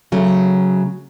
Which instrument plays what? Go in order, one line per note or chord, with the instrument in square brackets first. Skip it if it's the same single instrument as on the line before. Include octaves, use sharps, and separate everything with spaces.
[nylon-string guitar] C#3 F#3 A3